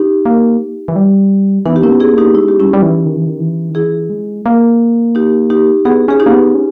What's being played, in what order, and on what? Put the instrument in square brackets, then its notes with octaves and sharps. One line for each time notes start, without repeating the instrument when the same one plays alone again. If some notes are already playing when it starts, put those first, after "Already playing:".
Already playing: [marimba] D#4 G4
[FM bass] A#3
E3
G3
[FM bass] E3 [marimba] B3 D#4
[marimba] G4
[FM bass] A#3 [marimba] C#4 E4
[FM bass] B3
[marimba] E4 G#4
[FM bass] A#3
[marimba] D#4 G4
[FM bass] G#3 [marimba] E4
[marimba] G4
[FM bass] G3 [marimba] C#4 E4
[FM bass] G3
E3
D#3
E3
D#3
E3
D#3
[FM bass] E3 [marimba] E4 G#4
[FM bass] G#3
A#3
[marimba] D#4 G4
D#4 G4
[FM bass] B3 [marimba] E4 G#4
[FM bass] C#4 [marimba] G#4
[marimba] D#4 G4
[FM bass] A#3
B3
C#4